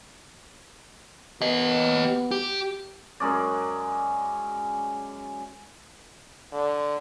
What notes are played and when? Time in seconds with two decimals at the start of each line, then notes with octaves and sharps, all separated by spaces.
1.42 B3 G4 D#5
2.31 G4
3.20 F#2 G#3 C#4 D5
6.53 D3